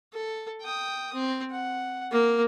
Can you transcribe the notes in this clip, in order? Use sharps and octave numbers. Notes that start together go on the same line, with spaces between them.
A4
G5 D#6
C4
F#5
A#3